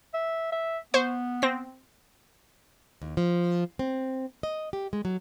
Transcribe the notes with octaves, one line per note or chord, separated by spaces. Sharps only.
E5
E5
B3 C5 C#6
C4 A#6
D#2
F3
C4
D#5
G4
G#3
F#3